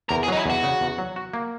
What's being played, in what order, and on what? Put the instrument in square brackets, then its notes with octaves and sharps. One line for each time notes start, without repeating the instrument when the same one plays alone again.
[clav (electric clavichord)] E2 [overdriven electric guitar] A#4
[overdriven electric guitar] G#4
[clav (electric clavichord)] F#3 [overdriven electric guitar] D#4
[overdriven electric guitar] E4
[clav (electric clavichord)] E2 [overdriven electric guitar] F#4
[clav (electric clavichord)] C#3
E2
F#3
F#4
A#3